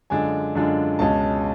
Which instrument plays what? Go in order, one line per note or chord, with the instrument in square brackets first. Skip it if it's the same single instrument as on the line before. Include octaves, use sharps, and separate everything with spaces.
[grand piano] F#2 D3 G#3 D4 F4 G#5
F#2 D3 G#3 D4 F4
C#2 B2 G#3 C#4 A5